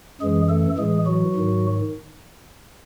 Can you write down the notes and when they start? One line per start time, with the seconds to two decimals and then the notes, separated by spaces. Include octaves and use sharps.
0.21 F#2 E3 G#3 G#4
0.50 A3 A4
0.78 A2 E3 G#3 G#4
1.06 F#3 F#4
1.36 G#2 D#3